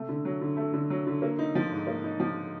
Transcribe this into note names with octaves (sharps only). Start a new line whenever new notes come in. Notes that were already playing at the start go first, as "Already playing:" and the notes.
Already playing: C3 A3
D3
F#3
D3
A3
D3
F#3
D3
A#3
D#4
F3
G#2
A#3
D#4
F3